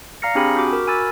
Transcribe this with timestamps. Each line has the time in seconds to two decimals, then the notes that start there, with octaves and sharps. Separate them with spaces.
0.22 D5 F5 A#5 F6 A#6 C#7
0.35 C4 D4 G4 G#4 G#5 B5
0.56 F#4 D6
0.68 F#4 A#4
0.87 G#5 B5 E6 A6